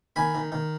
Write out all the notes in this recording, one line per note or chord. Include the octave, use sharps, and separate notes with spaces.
D#3 G#5 B5
D#3
D#3